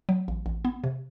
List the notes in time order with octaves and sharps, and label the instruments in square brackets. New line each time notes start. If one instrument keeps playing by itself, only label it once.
[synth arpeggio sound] F#3
A1
A1
B3
C3